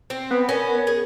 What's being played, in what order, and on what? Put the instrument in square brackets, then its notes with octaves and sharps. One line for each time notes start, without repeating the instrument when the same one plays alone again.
[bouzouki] C4
[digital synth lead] B3
[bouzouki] C#4 [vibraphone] A#4
[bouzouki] G#4